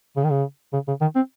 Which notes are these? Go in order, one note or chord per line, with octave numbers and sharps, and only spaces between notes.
C#3
D#3
C#3
C#3
C#3
D#3
C4